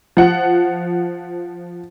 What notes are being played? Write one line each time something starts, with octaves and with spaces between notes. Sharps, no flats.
F3 F#5